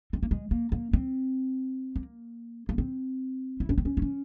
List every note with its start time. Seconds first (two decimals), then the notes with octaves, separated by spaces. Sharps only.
0.13 C4
0.23 A#3
0.31 G#3
0.51 A#3
0.72 A#3
0.93 C4
1.96 A#3
2.69 A#3
2.78 C4
3.60 E4
3.69 C#4
3.78 C4
3.85 C#4
3.97 E4
4.02 C#4